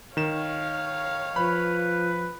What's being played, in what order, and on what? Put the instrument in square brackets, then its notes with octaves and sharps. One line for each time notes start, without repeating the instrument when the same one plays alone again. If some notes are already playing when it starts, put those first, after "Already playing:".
[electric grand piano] D#3 E7 [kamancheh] C#5 F5
[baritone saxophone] F3 [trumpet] B4 [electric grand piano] B5